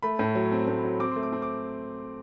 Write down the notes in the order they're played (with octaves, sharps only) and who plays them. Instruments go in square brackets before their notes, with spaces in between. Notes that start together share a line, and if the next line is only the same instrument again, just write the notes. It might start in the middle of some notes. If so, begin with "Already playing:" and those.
[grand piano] A3 B5
A2
F#3
C4
A2
F#3
C4 D6
A3 C6
D6
C4
D6